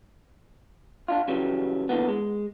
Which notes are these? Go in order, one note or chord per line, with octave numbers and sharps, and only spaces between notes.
D4 D#4 F4
C#3 E3 F#3 G3
A#2 D3 E3 F3 B3
G#3